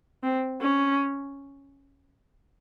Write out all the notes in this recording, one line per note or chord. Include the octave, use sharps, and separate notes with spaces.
C4
C#4